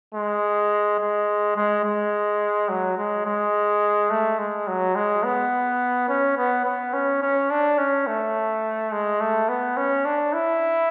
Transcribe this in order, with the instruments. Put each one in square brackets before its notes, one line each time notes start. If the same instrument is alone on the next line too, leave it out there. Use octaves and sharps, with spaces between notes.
[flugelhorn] G#3
G#3
G#3
G#3
F#3
G#3
G#3
A3
G#3
F#3
G#3
B3
C#4
B3
B3
C#4
C#4
D4
C#4
A3
G#3
A3
B3
C#4
D4
E4